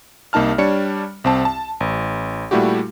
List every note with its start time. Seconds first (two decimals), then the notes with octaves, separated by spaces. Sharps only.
0.33 C2 A#3 D#4 A5 F6
0.58 G3 D4 C#5 C#7
1.24 C2 C4 A5
1.45 A5
1.80 A1
2.51 A#2 G3 A3 E4 F#4 G4